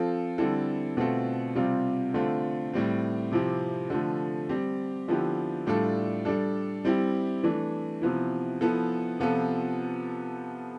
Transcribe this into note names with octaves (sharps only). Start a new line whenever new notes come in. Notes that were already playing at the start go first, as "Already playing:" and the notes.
Already playing: F3 C4 F4 A4
D3 G3 C4 E4 A4
B2 A3 C4 F4 A4
C3 G3 C4 F4
D3 A3 C4 F4
A2 G3 C4
C3 F3 C4 E4 G4
D3 F3 A3
G3 C4 G4
D3 F3 B3 E4 G4
A2 G3 D4 F4 A4
G3 D4 A4
G3 C4 E4 G4
E3 A3 D4
C3 F3 B3 E4
F3 B3 E4 A4
C3 F3 B3 F4 A4